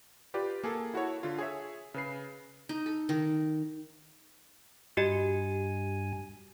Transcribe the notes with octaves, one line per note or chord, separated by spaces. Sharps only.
F4 G4 B4 D5
A#3 G#4 A4
E4 F#4 A4 C#5
D3 F4
G#4 C#5 E5
C#3 B4 C7
D#4
A4
D#3
G2 F#4 G4 D#5 G#5